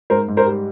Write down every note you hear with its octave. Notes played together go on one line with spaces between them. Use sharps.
G#2 A#4 C5
G#2
A#4 C5
G3